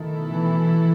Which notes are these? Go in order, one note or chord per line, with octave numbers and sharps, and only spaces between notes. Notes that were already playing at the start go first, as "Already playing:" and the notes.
Already playing: B2 D#3 A3 E4 A4
E3